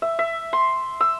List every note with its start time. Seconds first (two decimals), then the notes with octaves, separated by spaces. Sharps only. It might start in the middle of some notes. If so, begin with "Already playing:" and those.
0.02 E5
0.19 E5
0.53 C6
1.01 E6